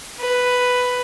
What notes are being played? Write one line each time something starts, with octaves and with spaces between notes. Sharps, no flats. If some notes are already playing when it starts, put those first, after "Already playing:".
B4